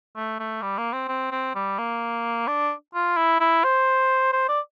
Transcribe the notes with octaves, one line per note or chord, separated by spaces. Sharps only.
A3
A3
G3
A#3
C4
C4
C4
G3
A#3
D4
F4
E4
E4
C5
C5
D5